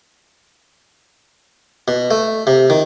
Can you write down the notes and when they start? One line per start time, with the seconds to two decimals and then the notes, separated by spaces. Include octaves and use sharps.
1.88 B2
2.11 A3
2.47 C3
2.70 D#3